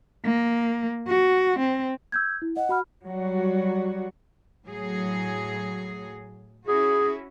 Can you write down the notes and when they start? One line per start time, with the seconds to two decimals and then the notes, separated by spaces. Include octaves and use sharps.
0.25 A#3
1.08 F#4
1.59 C4
2.12 E6 G6 G#6
2.42 E4
2.57 D#5 F#5
2.69 F#4 B5 F6
3.06 F#3 G3 F#4
4.66 A2 F#3 G#4
6.67 C#4 E4 F#4 G#4